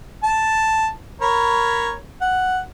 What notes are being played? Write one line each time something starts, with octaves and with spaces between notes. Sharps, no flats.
A5
A#4 C#5 B5
F#5